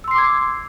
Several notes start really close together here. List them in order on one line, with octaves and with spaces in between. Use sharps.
E6 C6 C7 D6 G#6